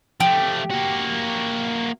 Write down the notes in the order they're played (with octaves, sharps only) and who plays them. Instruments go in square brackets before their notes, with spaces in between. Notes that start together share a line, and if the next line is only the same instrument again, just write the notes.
[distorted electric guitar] F3 A3 [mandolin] G4
[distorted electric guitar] A#3 F#4